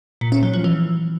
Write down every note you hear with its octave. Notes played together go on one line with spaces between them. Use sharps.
A#2
C#4
F#3
F3
E3